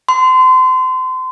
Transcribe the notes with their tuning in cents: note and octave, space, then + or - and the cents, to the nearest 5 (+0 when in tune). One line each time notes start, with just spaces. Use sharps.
C6 -30